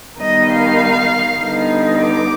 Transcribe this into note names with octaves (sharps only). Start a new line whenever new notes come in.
D#3 G3 B3 D#4 D#5
F5
D3 G3 B3 D#4
D6